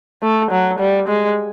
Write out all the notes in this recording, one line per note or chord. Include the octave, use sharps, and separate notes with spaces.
A3
F#3
G3
G#3